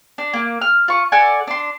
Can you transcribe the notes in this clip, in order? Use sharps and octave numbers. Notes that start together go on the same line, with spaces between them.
D4
A#3
F6
F4 C#6
A4 D5 F#5 G#5
D4 C6